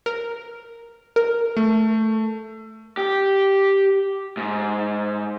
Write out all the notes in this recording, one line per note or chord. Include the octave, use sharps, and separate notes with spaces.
A#4
A#4
A3
G4
G#2